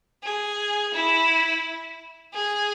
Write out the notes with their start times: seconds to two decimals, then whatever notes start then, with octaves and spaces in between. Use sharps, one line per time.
0.23 G#4
0.93 E4
2.34 G#4